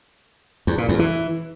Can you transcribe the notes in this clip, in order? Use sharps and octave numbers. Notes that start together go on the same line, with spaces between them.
E2
A#2
E2
E3